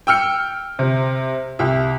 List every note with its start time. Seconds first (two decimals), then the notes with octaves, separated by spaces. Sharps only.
0.07 G5 E6 F6 C#7
0.79 C3
1.59 C2 G4 E5